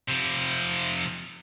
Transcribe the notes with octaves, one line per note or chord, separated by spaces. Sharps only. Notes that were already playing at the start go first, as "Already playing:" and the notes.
C3 F3